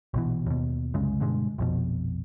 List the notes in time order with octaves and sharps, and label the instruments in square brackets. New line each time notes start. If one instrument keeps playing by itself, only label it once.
[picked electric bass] A#1 B2 E3
D#2 B2
C2 F#2 C#3 G#3
G2 B2 D3 G#3
A#1 F2 B2